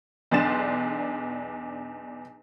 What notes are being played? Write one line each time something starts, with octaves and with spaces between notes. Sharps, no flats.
B1 E2 D4 C6 A6 E7